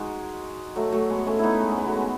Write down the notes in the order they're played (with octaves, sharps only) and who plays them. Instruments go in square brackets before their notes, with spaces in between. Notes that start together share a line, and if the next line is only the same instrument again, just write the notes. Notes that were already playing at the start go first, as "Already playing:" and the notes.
Already playing: [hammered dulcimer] G#3 D#4 F#4
F#3 A3
F#3 A3
G#3 B3
A3 C#4
B3 D#4 E4
G#3
C#4
G#3 B3
F#3 A3
G#3